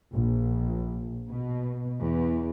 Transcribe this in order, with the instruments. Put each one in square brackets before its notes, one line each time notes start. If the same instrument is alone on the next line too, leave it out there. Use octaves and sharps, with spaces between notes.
[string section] A#1
B2
E2